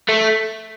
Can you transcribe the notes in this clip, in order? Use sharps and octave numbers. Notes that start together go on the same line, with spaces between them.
A3